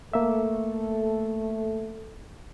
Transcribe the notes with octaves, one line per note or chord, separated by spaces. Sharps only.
A3 A#3 A4 E5